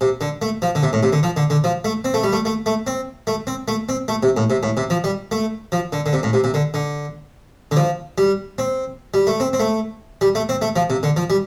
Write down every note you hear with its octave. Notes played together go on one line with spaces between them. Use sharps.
C3
D3
A3
F3
D3
C3
A2
C3
D3
F3
D3
D3
F3
A3
C4
A3
G3
A3
A3
A3
C4
A3
C4
A3
C4
A3
C3
A2
C3
A2
C3
F3
G3
A3
F3
D3
D3
C3
A2
C3
C3
D3
D3
D3
F3
G3
C4
G3
A3
C4
C4
A3
G3
A3
C4
A3
F3
C3
D3
F3
G3